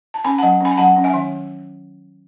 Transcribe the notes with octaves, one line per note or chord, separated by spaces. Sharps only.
A5
C#4 G#5 B5
F#5 A5
F#3
C#4 G#5 B5
B5
F#3 F#5 A5
C#4
E5 G#5
D#3